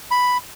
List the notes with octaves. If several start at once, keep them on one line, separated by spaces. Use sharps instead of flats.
B5